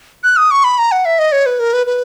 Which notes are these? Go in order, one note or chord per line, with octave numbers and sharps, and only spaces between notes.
F#6
D#6
C#6
B5
A#5
F#5
E5
D#5
C#5
B4
A#4
B4
B4